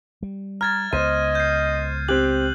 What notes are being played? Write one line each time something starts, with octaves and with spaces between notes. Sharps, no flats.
G3
A#5 F6 G#6 A6
C#2 B3 C5 D#5 D#7
G6 C7
C4 G4 F#6 F#7